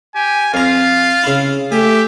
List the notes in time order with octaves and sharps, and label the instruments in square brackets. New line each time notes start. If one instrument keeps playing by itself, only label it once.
[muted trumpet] G4 [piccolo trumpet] G#5
[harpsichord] F2 A#5 [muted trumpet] F4 [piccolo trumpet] F5
[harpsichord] C#3 E4
[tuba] A3 [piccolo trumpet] G4 [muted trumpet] E5 [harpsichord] G#5